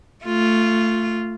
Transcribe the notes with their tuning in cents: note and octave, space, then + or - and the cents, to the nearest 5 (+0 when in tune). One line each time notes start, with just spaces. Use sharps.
A3 +15 F4 -5